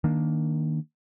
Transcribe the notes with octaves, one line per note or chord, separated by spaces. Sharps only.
D#3 A#3 D4